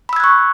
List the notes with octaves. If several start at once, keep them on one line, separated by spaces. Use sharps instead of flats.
B5 C#6 E6 F#6 G#6